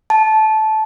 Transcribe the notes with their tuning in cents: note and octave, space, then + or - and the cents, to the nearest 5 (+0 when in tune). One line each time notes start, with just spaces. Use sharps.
A5 -15